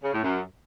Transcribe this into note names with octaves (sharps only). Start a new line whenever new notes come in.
C#3
A2
F#2